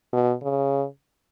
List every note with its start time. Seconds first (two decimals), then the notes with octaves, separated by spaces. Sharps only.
0.13 B2
0.43 C#3